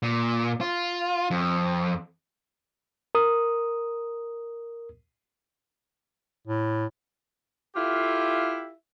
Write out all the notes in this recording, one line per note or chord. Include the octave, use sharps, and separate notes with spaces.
A#2
F4
F2
A#4 D#6
A2
E4 F4 G4 A4 E5 F5